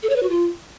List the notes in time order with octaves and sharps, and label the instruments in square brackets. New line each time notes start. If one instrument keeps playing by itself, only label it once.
[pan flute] A4
C#5
B4
F#4
F4